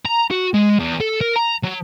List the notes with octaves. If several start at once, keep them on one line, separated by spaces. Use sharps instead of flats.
A#5
F#4
G#3
E2
A4
A#4
A#5
F#3